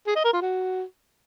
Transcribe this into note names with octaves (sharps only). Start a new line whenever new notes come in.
G#4
D#5
A#4
F4
F#4